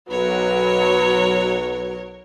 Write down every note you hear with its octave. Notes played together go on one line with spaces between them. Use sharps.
B1 F#3 A#4 B4 C#5